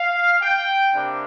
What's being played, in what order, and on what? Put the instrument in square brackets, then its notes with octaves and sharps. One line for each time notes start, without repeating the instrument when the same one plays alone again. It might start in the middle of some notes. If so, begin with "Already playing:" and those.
Already playing: [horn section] F5
G5
C3 G3 A#3 D4